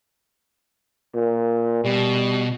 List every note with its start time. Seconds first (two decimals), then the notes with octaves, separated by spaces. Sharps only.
1.14 A#2
1.85 B2 G3